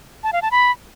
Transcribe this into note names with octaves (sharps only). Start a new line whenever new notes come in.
A5
F5
A5
B5